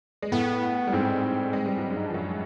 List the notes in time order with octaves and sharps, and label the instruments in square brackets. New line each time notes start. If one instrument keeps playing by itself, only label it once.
[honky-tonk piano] G#3
[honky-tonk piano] A2 A3 [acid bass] B3
[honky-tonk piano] G3
[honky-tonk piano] G#2 G#3 [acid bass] C4
[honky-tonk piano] G#3
G3
F#3
G2 G3
[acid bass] D#4
D4
[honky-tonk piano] F3
[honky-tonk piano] F#2 F#3 [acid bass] C#4